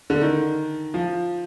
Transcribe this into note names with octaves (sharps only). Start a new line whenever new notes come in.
D3
D#3
F3